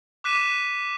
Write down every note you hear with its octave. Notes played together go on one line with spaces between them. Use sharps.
D6 F#6 B6 D#7 E7